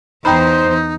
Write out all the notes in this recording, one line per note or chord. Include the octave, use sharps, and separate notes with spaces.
E2 D#4 C5 G5 A#5 B5